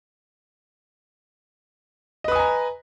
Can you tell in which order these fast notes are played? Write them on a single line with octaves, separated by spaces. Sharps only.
D#5 B4 D#6 G#5 A#5